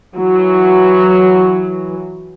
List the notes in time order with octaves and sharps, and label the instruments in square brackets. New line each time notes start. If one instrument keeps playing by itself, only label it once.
[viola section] E3 F#3